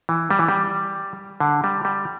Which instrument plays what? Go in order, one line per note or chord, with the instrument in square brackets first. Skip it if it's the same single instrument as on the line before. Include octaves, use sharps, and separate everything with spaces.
[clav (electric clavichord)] E3
G3
E3
G3
D3
G3
G3